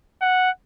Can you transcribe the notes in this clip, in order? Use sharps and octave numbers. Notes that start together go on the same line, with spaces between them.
F#5